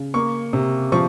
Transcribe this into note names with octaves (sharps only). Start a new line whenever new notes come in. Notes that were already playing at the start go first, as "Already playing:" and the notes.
Already playing: C#3
A#3 C#6
C3
F3 C#6